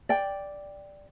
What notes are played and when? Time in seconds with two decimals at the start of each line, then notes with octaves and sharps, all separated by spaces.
0.09 D5 G5